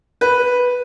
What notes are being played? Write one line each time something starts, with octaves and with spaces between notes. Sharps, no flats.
B4